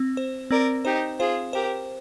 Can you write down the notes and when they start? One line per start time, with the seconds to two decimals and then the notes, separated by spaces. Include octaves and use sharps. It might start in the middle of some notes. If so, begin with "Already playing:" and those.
Already playing: C4
0.17 C5
0.51 C4 A#4 D5
0.85 D#4 G4 C5
1.19 F4 G#4 C5
1.53 G4 A#4 C5